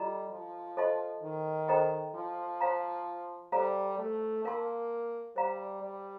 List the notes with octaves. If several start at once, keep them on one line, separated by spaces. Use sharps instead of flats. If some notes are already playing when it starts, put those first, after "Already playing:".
Already playing: G3 F4 A4 D#5 A#5
F3
A4 C5 D#5 A5 C6
D#3
A4 C5 D#5 G5 A#5
F3
C5 F5 A#5
G3 A4 C5 F5 A#5
A3
A#3 A#4 F5 A5 C6
G3 C5 F5 A#5
G3